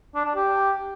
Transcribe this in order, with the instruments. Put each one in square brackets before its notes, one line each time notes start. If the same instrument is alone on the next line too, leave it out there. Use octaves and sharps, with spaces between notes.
[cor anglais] D4
D4
G4